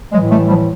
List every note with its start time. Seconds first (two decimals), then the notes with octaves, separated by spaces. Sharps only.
0.12 A2 E3 F#3 G#3
0.30 G3 A3
0.48 F3 G3